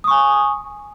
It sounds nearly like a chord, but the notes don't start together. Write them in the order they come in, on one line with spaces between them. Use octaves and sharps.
D#6 C#6 G#5